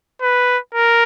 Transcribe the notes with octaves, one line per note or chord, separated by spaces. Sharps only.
B4
A#4